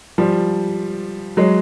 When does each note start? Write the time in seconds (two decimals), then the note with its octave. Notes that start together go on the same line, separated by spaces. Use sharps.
0.18 F3 G3
1.37 F#3 G#3